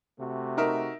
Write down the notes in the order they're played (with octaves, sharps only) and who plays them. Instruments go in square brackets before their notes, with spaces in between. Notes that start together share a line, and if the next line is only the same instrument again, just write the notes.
[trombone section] C3 A3 F#4
[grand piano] D#4 A#4 E5